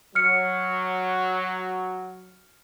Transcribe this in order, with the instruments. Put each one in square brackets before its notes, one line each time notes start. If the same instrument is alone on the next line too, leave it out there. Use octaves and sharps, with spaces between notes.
[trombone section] F#3 [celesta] F6 C#7